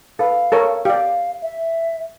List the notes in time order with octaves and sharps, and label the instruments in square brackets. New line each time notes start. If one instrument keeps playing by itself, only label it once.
[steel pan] A4 B4 [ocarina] F5
[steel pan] A4 A#4 C#5
[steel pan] G4 D5 [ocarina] F5
[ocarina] E5